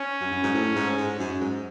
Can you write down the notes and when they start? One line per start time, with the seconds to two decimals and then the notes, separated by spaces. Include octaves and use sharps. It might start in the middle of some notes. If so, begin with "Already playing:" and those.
Already playing: C#4
0.21 F#2
0.32 F#2
0.43 G#2
0.54 A2
0.76 G#2
0.97 G#2
1.19 F#2
1.41 G#2